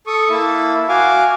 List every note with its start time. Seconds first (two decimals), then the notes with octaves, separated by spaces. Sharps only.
0.07 A4 C#6 D#6
0.30 A#3 E4 E5 A5
0.89 F#4 F5 G#5 D6